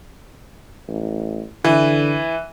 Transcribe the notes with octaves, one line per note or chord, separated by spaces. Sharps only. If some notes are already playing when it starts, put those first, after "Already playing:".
A1
D3 E3